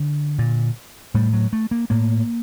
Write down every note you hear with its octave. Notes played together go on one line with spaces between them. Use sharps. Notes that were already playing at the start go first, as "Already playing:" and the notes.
Already playing: D3
A#2
A2 G3
F#3
A3
A#3
A2 A#3